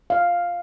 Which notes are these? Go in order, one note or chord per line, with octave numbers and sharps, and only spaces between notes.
F5